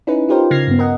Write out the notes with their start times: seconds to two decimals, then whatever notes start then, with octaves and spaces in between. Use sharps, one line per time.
0.07 C#4 D#4 E4 B4
0.29 D#4 F4 G4 A#4 C5
0.51 C#3 F6 G#6 A#6 C7
0.67 G2 B3
0.79 A#4 D#5 F#5